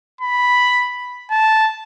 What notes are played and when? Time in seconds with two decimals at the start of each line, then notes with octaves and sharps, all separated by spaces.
0.21 B5
1.31 A5